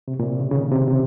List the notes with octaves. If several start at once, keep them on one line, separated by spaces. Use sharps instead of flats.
C3
A#2
C3
C#3
C#3
D#3
C3
C3